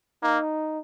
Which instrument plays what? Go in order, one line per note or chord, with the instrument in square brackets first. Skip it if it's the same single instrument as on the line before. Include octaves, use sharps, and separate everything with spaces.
[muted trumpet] A#3 [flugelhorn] D#4